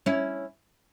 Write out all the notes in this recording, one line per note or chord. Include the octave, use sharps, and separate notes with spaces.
C#4 E4